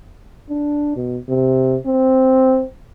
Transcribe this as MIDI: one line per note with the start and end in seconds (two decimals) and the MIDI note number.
0.50 0.96 62
0.96 1.17 47
1.29 1.77 48
1.86 2.65 60